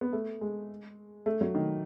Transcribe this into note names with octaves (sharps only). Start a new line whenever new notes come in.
B3
A3
G#3
A3
F#3
D#3